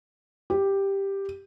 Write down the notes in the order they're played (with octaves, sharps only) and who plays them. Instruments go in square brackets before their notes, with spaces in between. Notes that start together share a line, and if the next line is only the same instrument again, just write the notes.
[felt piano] G4